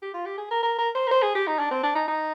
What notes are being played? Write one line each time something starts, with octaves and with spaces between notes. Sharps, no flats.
G4
F4
G4
G#4
A#4
A#4
A#4
C5
A#4
C5
G#4
G4
D#4
D4
C4
D4
D#4
D#4